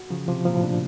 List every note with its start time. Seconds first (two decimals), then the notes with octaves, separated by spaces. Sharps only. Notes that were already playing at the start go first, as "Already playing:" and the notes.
Already playing: F#4
0.10 C#3 F3
0.28 C3 F3
0.45 A#2 F3
0.54 A2
0.63 D4